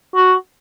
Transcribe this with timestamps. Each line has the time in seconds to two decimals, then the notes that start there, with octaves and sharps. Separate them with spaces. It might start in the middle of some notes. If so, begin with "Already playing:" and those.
0.15 F#4